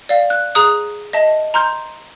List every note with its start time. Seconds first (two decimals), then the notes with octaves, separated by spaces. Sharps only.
0.09 D5 F5
0.30 F#6
0.55 G#4 A#5 D#6 F#6
1.13 D#5 E5 A5
1.54 A#5 C6 F6 G6